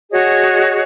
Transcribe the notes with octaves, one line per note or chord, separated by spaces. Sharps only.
F#4 G#4 C#5 D#5